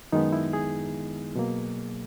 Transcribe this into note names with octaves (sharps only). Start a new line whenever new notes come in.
F#2 D#3 G#3 B3 D#4
E4
G#4
B2 F#3 A#3